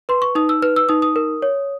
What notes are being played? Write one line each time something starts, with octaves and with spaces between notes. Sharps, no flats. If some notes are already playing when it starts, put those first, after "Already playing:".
B4 C6
C#6
D#4 D#6
E6
B4 F6
E6
D#4 D#6
D#6
A#4
C#5